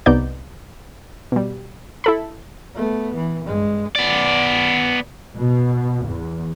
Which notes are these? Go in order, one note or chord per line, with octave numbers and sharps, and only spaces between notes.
C2 C3 B3 D#4 D5 G6
B2 G3
E4 A4 B5
A3 B3
E3
G2 G#3
B3 D5
B2
E2